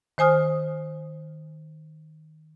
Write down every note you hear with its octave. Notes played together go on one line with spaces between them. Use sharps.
D#3 C5 G#5 D#6 F6